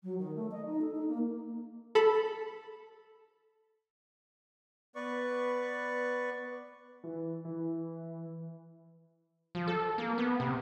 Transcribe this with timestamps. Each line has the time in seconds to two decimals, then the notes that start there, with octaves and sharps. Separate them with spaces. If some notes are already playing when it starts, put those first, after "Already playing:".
0.03 F#3
0.18 D#3
0.35 A3
0.51 D#5
0.66 D#4
0.81 A4
0.95 D#4
1.08 A#3
1.95 A4 B5
4.95 B3 B4 D5 C#6
7.04 E3
7.45 E3
9.55 F3
9.68 A4
9.98 A#3
10.18 B3
10.40 C3